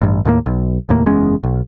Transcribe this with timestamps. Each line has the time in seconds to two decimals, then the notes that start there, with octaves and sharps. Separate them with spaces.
0.02 A1 G2
0.25 D#2 A2 G#3 A#3
0.46 B1
0.89 F1 D#2 A2 A#3
1.06 F#1 E2 G#3 C#4
1.43 B1